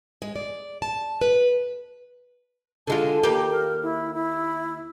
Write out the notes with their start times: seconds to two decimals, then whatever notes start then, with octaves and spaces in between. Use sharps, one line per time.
0.22 G#3
0.36 D5
0.82 A5
1.21 B4
2.87 D3 G#3 F4 A5
3.23 D#2 A#3 G4
3.51 A#4
3.83 E4
4.14 E4